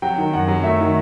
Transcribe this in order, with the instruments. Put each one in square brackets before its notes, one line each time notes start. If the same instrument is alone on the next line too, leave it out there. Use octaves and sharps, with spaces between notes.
[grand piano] F#3 G5
D#3
F#2 F#5
F#3
A3 E5
D#3